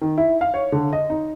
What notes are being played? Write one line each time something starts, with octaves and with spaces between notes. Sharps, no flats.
D#3
E4
F5
C#5
D3
D#5
D#4